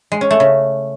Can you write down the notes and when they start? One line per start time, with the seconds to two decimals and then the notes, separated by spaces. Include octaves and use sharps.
0.12 G#3
0.21 C#4
0.31 A3
0.40 C#3